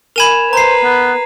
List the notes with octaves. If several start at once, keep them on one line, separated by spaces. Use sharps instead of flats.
A#4 G#5 B5 G#6 E7 F7
B4 C5 A#5 C7
B3